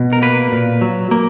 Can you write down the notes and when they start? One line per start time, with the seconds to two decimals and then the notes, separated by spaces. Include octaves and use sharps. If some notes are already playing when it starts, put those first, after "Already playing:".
Already playing: B2
0.13 A#4
0.22 A#3 B4
0.52 A#2
0.81 F#3
1.11 A#3